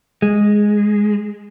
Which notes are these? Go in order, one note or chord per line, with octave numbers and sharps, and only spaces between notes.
G#3